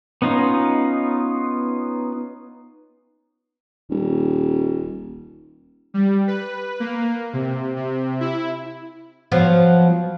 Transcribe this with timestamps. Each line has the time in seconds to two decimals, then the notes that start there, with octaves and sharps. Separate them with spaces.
0.22 B3 C#4 D#4 F4
3.90 D#1
5.94 G3
6.27 B4
6.80 A#3
7.33 C3
7.76 C3
8.20 E4
9.32 F3 F#3 B3